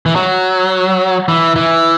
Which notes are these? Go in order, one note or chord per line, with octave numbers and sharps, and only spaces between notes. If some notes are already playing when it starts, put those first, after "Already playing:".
E3
F#3
E3
E3